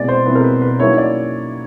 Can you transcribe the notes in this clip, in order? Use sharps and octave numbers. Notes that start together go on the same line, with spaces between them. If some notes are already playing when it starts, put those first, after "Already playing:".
Already playing: B2 G#3 C4 E4 D5
C5
B2 G#3 C4 E4 B4
A#4
B4
B4
D#3 F#3 A#3 C#4 E4 C#5
D5